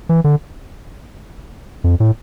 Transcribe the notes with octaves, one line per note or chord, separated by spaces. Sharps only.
E3
D3
F2
A2